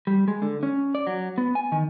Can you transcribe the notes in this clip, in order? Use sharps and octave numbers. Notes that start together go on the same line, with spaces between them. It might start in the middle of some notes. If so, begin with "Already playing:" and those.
G3
G#3
D3
C#4
D5
F#3
B3
G#5
D#3